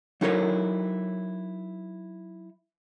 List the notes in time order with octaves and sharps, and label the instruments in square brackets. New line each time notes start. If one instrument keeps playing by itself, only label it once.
[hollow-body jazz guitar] F#3 D#4 E4 A4 A#4 C#5